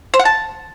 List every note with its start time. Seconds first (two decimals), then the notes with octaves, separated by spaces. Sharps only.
0.14 C5
0.19 F#5
0.25 A5